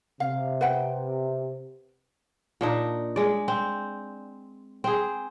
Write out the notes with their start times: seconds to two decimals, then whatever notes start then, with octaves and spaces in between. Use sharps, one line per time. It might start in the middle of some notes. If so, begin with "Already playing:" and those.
0.20 C3 F5
0.61 B4 F#5 G5
2.61 A#2 D4 D#4
3.16 G#3 D5
3.48 C4
4.84 C4 G#4